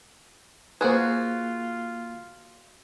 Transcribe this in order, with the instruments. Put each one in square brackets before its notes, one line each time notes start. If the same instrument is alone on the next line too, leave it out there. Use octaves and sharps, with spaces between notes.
[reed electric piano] A#3 G#5 [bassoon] F4 [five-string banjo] F#4 G#4 [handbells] B4 C5